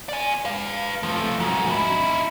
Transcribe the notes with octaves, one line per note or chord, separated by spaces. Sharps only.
D5 G#5
B4 F5
F3 A3
G#2 F#3
D#4 E4